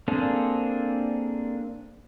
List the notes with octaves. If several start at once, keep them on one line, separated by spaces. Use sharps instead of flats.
A#3 C4 D4 G#4 A4